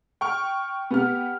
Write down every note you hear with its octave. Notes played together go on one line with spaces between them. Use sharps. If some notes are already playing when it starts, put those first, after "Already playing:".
G5 C#6 F6
B3 G4 F6